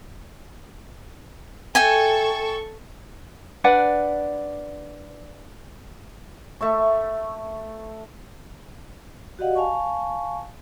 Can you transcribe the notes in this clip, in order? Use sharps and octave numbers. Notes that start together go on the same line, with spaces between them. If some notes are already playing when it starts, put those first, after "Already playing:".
A4 E5 G5 G#5 C#6
D4 B4 D5 F#5
A3 E5 C#6
F#4 G4 D5 D#5 F5 F#5
F5 G#5 A5 C#6